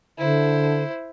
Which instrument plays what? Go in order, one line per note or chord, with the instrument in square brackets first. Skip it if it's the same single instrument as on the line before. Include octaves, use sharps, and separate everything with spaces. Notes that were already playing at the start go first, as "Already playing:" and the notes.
[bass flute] D3 [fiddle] E4 C5